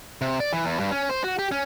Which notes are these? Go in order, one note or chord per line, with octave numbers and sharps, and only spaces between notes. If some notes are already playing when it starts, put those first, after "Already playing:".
C3
D5
E3
E2
G2
C#4
C5
F#4
G4
C#4